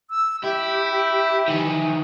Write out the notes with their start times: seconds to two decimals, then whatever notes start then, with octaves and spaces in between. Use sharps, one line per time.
0.10 E6
0.43 E4 G4
1.48 D#3 E3 G#5